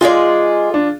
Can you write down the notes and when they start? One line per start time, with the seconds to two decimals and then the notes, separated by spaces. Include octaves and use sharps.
0.01 G#3 D#4 F4 G#4 D5
0.74 D4